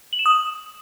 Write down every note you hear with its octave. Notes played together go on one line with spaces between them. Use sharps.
F#7
E7
D#6